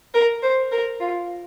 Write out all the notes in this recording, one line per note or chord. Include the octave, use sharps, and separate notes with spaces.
A#4
C5
A#4
F4